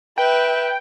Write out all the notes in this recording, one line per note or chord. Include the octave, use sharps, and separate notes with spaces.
B4 E5 G5